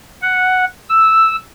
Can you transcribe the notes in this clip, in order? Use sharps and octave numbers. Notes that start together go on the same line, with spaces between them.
F#5
E6